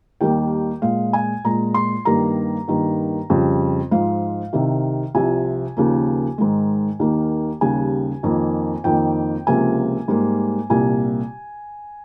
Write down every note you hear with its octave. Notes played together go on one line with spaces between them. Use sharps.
D#2 D#3 G3 A#3 G5
A#2 G#3 F5
G#5
A#2 G#3 A#5
C6
G2 D#3 G3 A#3 A#5
G2 D#3 A#3
F2 C#3 G3
G#2 F3 G#3 F5
C2 C3 D#3
C2 C3 F3 G#5
D#2 C#3 F3 A#3
G#2 D#3 G#3
D#2 D#3 A#3
D#2 C#3 G3 G#5
F2 D#3 A#3
F2 D#3 A#3 G5
C#2 C3 F3 A#3 G#5
G#2 G3 A#3
C2 A#2 G3 A#3 G#5